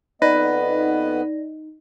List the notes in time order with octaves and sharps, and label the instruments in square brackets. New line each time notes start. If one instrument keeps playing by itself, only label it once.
[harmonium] F2 B3 D#5 [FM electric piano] D#4 [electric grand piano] B4 [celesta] D5 A#6